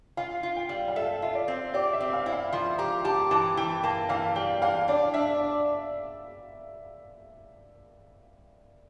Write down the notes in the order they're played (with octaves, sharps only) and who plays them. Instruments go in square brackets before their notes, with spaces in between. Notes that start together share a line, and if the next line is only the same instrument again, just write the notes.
[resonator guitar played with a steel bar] F4 [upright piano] F5
[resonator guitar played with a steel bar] F4
[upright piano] G5
[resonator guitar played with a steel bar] G3
[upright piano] F5
[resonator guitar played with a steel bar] A4 [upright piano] E5
[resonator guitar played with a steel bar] F4 [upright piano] E5
[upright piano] D5
[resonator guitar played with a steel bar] C4
[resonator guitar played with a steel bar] G4 [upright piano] D5
[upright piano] E5
[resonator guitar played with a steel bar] C4
[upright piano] F5
[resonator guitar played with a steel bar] E4
[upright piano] F5
[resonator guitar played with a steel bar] F3 [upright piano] C6
[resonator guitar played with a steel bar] G4 [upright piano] A#5
[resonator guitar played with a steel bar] G4 [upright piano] A5
[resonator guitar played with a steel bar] E3 [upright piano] A5
[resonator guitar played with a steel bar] E3 [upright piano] G5
[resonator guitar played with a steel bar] A#3 [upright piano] A5
[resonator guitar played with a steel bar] E3 [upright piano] F5
[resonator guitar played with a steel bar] G3 [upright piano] G5
[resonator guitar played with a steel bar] E3 [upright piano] F5
[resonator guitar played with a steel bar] D4 [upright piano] D5
[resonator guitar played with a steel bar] D4 [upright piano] E5